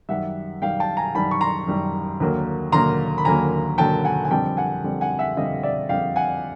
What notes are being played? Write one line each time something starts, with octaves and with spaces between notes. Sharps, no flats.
F#2 D#3 G3 E5 F#5
F#2 D#3 G3 F5 G5
G5 A5
G#5 A#5
F#2 D#3 G3 A5 B5
C#6
A#5 C6
F#2 D#3 G3
D#2 D3 F#3 A#3
D#2 D3 F#3 A#3 A#5 C6
B5
D#2 D3 F#3 A#3 G#5 A#5
D#2 D3 F#3 A#3 G5 A5
F#5 G#5
G#5
F2 D3 G3 C4 G5 A5
F#5 G#5
F2 D3 G3 C4
F#5 G#5
E5 F#5
F2 D3 G3 C4 D#5 F5
D5 E5
F2 D3 G3 C4 F5 G5
F#5 G#5